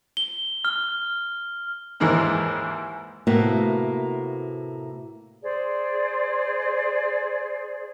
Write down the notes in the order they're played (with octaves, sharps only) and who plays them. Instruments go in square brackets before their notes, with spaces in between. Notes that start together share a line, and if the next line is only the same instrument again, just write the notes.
[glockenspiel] G7
F6
[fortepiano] D#2 G#2 E3 G#3 A#3
[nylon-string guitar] A2 C3 A#3 B3 F#4 E5
[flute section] G#4 C5 D5